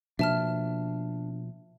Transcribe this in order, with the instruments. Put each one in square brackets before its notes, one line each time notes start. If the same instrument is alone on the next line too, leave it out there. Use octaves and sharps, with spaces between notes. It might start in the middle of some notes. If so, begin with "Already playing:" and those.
[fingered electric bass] B2 F3 A#3 [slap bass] D4 [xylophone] E5 A5 F6